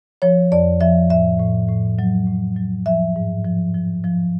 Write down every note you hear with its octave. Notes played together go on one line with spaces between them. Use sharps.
F3 C#5
F2 D5
F3 E5
A2 E5
A2
A2
F#3
A2
F#3
F3 E5
G#2
F3
F3
F3